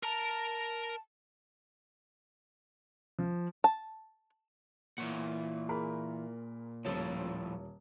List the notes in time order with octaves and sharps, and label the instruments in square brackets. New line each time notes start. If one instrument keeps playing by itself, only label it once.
[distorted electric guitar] A#4 A#5 [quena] A5
[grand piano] F3
[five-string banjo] A5
[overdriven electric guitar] A#2 [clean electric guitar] E3 C#5 F#5
[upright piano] G#4 A#4 B5
[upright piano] D#1 C#5 [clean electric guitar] A2 F3 A4